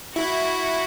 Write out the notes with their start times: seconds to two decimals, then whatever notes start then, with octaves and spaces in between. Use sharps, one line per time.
0.15 E4 F#4